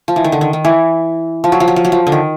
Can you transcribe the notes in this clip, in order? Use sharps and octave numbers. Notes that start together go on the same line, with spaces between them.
F3
E3
D#3
D3
D#3
D#3
E3
F3
F#3
F3
F#3
F3
F#3
F3
D3
D#3